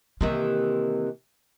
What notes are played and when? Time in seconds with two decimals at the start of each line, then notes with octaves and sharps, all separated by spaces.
0.21 C3 D#3 E3 A#3